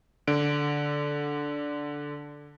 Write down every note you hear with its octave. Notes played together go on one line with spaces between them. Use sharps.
D3 D7